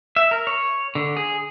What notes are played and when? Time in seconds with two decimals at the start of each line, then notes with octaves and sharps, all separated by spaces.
0.16 E5
0.31 A#4
0.47 C#5
0.95 D3
1.17 G#4